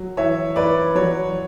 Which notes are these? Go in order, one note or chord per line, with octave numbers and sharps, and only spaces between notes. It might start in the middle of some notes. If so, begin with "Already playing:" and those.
Already playing: F#3
E3 C#5 E5
E3 B4 D5
F#3 C#5